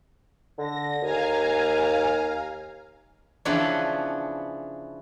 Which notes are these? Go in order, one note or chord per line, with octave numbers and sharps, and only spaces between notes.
D3 A#6
D#2 F5 G#5 A#5
C#3 E3 F3 B3 C#4 D4